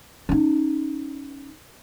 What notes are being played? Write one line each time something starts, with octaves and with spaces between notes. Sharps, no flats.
C#4 D#4